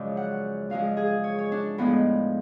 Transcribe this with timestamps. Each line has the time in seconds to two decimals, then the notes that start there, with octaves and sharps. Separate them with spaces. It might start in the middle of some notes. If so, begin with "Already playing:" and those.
Already playing: F#2 C#3 F3 G#3 D5
0.17 F#5
0.70 F#2 F3 G#3 F5
0.97 G#4
1.24 C#5
1.39 C#5
1.52 D4
1.78 A2 F3 G#3 B3